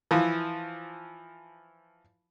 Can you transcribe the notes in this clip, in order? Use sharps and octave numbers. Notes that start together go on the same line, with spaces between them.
E3 F3